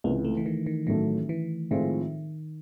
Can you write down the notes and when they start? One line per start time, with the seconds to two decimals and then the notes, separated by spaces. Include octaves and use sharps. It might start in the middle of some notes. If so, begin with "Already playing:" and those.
0.04 C#2 C3 E3 A#3
0.25 A3
0.37 E3
0.46 D#3
0.66 D#3
0.87 A1 A2 D#3 F#3 A3
1.29 E3
1.71 A2 D#3 F3 G#3 C4 F4